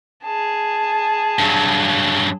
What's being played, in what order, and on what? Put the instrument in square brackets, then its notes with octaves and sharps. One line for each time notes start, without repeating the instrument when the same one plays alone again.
[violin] G#4 A5
[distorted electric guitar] G2 F#3